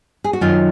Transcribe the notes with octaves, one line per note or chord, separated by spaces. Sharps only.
G#4
F#4
F#2 D#3 F#3 F4